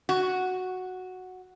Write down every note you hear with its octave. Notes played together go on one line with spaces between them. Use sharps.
F#4